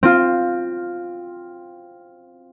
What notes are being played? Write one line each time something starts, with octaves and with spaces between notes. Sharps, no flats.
C4 F4